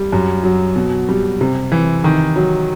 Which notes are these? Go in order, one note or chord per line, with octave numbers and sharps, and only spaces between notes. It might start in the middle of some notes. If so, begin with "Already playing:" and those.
Already playing: G3
F#2
F#3
B2
G3
C3
E3
D#3
F#3